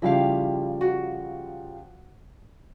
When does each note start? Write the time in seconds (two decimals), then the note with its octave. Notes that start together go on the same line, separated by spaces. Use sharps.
0.02 C#3 F3 G3 E4 G4 F5
0.81 F#4